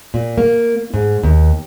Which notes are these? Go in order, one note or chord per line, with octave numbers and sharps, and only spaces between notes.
A#2
A#3
G#2
D#2